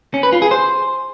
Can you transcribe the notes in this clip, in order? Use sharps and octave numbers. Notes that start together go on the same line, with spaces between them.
C#4
B4
F4
G#4
C5